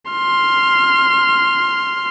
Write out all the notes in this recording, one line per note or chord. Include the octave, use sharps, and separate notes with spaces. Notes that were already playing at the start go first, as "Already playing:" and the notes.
C6 F6